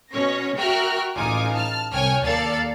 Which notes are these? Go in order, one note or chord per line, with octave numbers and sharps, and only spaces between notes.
B2 C#4 C#5 A#6
F#4 A#4 E5 G5 F6 F#6
A1 D#4 F4 G#5 D6
A5 F6
C2 C#5 G5 G#5 F6
D#2 A#3 A4 D5 F5 A6